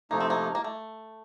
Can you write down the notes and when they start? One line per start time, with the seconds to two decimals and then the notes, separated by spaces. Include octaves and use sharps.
0.11 C3 F3 A3 A#3 D#4
0.20 C4
0.30 A#3
0.55 A#3
0.64 A3